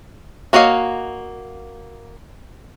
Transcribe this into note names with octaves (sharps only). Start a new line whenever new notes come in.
A#3 F#4 C#5 D#5 F5